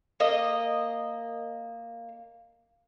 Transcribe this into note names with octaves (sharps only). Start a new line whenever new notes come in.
A#3 D#5